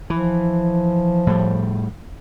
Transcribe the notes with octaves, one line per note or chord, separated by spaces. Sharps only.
E3 F3
A2 G3